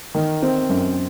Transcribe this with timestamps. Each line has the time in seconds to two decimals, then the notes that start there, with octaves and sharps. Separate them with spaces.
0.15 D#3
0.42 C4
0.69 F#2